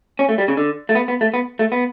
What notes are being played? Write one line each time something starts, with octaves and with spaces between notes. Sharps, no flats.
C#4
A3
G3
C#3
D3
A3
B3
B3
A3
B3
A3
B3